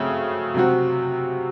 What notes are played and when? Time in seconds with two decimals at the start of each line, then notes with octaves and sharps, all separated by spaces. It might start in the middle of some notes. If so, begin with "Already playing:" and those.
Already playing: C#3 F#3 A3 C4
0.54 C3 F#3 C4 F#4